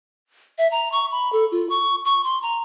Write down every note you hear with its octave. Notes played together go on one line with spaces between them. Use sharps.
E5
A#5
C#6
B5
A4
F4
C#6
C#6
C6
A#5